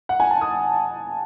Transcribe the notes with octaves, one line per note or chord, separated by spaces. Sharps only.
F#5
G#5
A5
D#6